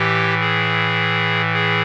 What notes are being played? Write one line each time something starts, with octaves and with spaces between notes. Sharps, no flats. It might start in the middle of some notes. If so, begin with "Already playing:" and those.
Already playing: A2 E3 G4
G#4
G#4